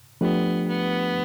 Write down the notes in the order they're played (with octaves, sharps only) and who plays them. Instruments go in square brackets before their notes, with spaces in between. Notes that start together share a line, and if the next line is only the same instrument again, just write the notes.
[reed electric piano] F3 A3 D4 G4 [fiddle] B3
[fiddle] B3